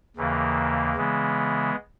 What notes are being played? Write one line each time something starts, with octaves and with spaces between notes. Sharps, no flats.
D#2 C#3 E3 A#3
C#3 E3 G#3 B3